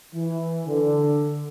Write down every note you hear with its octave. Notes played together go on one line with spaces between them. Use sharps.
E3
D3